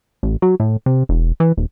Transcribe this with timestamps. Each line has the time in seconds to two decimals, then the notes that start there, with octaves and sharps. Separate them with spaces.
0.23 A1
0.42 F#3
0.60 A2
0.86 C3
1.09 E1
1.40 E3
1.57 D#1